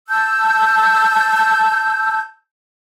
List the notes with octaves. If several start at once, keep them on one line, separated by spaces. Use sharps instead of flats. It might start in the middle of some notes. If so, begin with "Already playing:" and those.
A5 E6 G6